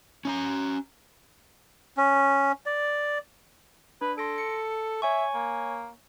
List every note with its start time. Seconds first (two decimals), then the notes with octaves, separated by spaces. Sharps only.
0.25 C#4 D4 A#5
1.97 C#4
2.66 D5
4.01 D4 B4
4.18 A4 C6 A#6 D7
4.38 C#7
5.02 C#5 E5 G#5 C#6
5.34 A#3